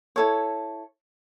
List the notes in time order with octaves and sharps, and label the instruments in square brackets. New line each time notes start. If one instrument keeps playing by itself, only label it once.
[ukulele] E4 A4 C#5